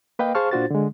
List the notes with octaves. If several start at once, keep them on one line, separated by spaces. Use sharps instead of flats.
A#3 B4 D#5 F5 G5
G#4 C5 F5 A5 C#6 F6
A#2 D4 F4 F#4 C5 A6
D3 G#3